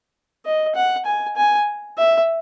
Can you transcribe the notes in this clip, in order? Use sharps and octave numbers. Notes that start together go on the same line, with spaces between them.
D#5
F#5
G#5
G#5
E5